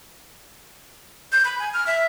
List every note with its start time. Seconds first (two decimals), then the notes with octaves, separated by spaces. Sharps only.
1.32 G6
1.45 B5
1.59 G#5
1.74 F6
1.87 E5